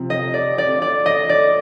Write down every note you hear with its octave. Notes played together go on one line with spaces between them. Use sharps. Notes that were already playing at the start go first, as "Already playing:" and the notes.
Already playing: C3 F3 C4
D#5
D5
D5
D5
D#5
D5